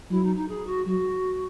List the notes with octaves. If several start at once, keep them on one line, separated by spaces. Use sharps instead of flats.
F#3 E4
D#4
D#4
G#4
F#4
F#3 F#4